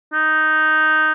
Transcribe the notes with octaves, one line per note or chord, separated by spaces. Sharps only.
D#4